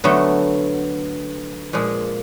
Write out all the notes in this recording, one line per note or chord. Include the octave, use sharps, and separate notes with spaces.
D3 F#3 A3 B3
A#2 F3 G#3